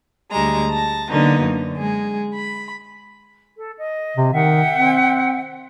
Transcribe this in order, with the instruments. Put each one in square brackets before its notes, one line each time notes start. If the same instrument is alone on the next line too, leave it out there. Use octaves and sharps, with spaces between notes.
[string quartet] D2 G3 G#3 A#5
A5 A#6
D3 F#3 A#3 B3 D#4
F#2 D3
G#3 G#4
B5
[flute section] A4
D#5
[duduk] C3
[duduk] D#3 [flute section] E5 F#5 G5
[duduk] C4